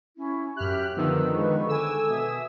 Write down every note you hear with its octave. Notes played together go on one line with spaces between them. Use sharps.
C#4 E4
F#2 G4 E5 F6 F#6
D3 D#3 F3 B3 E6
G#3 B4 C#6
A4 G#5 D6 E6
B2 E5 D#6